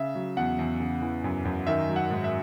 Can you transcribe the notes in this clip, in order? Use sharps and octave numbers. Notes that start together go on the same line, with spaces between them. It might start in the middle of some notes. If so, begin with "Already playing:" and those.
Already playing: C#3 E5
F#3
E2 F#5
E2
C#3
E3
F#2
F#2
D#3 E5
F#3
F#5
G#2
E5